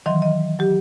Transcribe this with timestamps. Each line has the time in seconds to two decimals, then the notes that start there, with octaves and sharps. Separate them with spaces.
0.06 D#3 E3 F#3 D#5 C6
0.22 D#5
0.59 F#3 G4